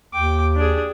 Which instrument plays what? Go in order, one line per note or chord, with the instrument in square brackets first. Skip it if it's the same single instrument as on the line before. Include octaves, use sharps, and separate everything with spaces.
[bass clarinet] D#2 [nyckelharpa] G5 D6
[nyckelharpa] D4 G#4